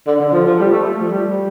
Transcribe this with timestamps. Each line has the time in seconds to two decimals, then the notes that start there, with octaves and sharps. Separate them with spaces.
0.07 D3
0.20 D3
0.32 F3
0.46 F3
0.59 G3
0.72 A3
0.84 A3
1.00 F3
1.10 G3